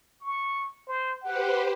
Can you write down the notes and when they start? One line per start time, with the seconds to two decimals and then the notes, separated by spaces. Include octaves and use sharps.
0.21 C#6
0.87 C5
1.23 G4 B4 C5 F#5